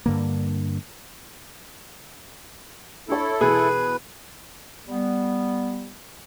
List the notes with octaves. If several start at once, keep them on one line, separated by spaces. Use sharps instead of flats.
G2 D3 A#3
D4 E4 A4 C#5
B2 E3 G#4 B4
G3 B3